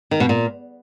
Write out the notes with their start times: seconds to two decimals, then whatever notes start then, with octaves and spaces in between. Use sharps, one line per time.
0.11 D#3
0.20 B2
0.29 A#2